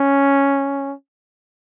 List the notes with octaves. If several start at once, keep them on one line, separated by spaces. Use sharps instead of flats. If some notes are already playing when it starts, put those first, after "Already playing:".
Already playing: C#4